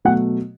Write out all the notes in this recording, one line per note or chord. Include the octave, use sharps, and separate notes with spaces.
B2 F#3 A3 F#5